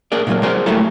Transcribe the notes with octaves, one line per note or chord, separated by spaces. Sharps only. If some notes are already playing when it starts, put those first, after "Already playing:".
A#3 G#4 A#4 D5
A#2 D3 D#3 F#3 A#3
F#4 G#4 A#4 C5 D5
F#3 G3 A3 A#3 E4 A4